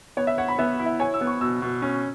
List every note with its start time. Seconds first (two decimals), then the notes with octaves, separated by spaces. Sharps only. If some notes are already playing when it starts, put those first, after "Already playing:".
0.17 B3 C#5
0.27 E5
0.38 C#5 F#5
0.48 B5
0.59 B3 E5
0.80 E4
0.86 E5
1.00 C#5 G#5
1.14 E6
1.21 B3
1.27 C#6
1.41 B2 E6
1.62 B2
1.82 C#4